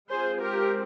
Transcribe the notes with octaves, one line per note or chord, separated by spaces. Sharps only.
G#3 C4 F4 G#4 C5
G4 A#4